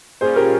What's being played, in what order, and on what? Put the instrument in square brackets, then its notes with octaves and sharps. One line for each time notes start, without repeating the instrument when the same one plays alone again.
[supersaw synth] A#2 G3 C#4 F4 [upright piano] G#4 C5
[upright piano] G4 A#4